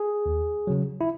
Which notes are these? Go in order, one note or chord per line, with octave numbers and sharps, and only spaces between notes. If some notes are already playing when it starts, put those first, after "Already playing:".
Already playing: G#4
D#2
C#3 F#3
E4